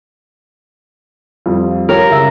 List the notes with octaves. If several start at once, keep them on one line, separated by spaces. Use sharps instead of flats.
F2 G3 F4
F4 G4 A#4 C#5
C#2 E5 E6